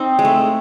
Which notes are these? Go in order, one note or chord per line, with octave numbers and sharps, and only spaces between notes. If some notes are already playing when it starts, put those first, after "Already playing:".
Already playing: C4 D#4
G#3
A3